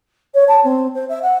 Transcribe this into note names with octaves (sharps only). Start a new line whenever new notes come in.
C#5
A5
C4
C5
E5
F#5